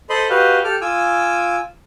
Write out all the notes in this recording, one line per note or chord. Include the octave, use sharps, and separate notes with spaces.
A4 C5 D#5 B5 C6
F#4 G4 B4 D#5 F5
G4 A4 D6 F6
F4 G#5 D6 E6